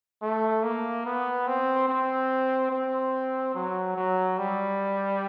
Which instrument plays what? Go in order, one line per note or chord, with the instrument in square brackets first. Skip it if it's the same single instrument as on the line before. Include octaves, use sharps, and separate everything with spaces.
[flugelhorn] A3
A#3
B3
C4
C4
C4
F#3
F#3
G3